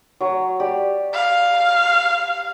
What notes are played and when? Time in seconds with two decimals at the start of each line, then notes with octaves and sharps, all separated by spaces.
0.21 F#3 C#5
0.60 G4 D5
1.14 F5